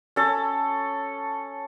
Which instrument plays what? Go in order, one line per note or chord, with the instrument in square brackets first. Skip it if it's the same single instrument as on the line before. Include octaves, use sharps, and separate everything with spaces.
[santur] C#4 A4